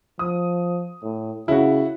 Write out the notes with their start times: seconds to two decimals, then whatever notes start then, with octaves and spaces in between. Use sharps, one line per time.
0.19 F3 D#6
1.03 A2
1.48 C#3 E4 F#4